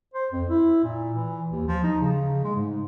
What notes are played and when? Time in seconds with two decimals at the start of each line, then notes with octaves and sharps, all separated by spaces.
0.14 C5
0.31 F2
0.48 E4
0.84 A#2
1.15 E3
1.51 D#2
1.67 F3
1.83 D#4
2.01 C#3
2.44 G#3
2.56 G#2